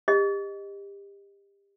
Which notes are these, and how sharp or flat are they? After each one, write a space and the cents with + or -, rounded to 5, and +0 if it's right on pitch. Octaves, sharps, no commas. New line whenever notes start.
G4 +30 D#5 -5